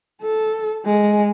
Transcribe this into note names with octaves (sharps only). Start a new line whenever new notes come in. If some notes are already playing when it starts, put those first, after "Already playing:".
A4
G#3